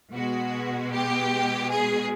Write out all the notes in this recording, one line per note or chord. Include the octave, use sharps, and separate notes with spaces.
B2 G#3 F#4
G4
G#4